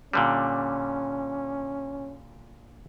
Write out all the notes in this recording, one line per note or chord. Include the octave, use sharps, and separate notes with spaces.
A#2 D3 G3 C#4